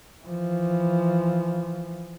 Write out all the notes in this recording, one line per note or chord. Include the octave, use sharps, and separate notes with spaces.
E3 F3